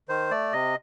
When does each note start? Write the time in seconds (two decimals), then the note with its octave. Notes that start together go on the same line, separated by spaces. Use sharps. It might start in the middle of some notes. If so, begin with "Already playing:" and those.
0.09 D#3 C5
0.31 A3 D5
0.53 C3 D#5